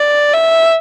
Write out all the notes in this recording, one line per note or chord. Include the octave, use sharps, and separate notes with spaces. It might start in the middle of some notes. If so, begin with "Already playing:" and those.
Already playing: D5
E5